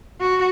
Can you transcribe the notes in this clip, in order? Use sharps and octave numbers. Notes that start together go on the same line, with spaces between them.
F#4